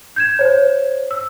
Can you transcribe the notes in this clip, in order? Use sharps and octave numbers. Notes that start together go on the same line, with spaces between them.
G6 G#6 E7
C5 C#5
E6